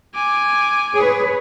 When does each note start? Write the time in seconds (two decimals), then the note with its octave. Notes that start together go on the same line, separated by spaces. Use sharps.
0.15 G#5 D6
0.94 G#4 B4 C#5